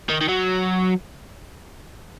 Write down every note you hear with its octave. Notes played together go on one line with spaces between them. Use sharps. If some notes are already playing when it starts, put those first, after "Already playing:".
D#3
D#3
F#3